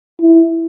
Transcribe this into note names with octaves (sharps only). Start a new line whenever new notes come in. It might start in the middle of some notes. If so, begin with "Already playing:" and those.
E4